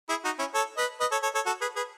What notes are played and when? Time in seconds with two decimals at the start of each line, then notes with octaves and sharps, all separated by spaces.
0.09 E4 G#4
0.25 D#4 F#4
0.39 C#4 E4
0.54 A4 C#5
0.77 B4 D#5
1.00 B4 D#5
1.12 A4 C#5
1.23 A4 C#5
1.34 A4 C#5
1.46 F#4 A4
1.61 G#4 B4
1.76 G#4 B4